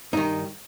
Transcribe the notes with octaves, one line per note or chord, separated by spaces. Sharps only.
G2 D#3 D#4